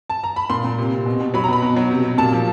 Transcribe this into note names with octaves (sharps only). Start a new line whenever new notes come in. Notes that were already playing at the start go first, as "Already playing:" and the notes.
A5
A#5
B5
A#2 C6
A#2
C3
C3
B2
B2
F#3 B5
A#5
B2 B5
B2
F#3
C3
C3
A#2 A5
F3